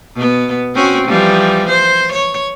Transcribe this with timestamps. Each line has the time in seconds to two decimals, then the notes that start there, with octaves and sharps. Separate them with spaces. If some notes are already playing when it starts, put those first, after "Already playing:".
0.15 B2 B3
0.75 C4 C#4 F#4
1.08 E3 F3 G3
1.69 C5
2.12 C#5